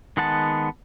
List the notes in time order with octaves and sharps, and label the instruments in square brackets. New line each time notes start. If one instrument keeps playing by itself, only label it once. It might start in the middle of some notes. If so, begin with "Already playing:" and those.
[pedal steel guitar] D#3 G#3 B3 F#5 A5